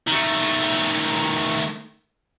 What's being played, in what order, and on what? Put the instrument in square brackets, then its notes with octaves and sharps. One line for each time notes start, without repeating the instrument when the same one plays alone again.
[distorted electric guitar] D#3 A3